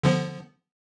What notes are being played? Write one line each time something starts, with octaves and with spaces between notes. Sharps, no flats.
D3 F3 B3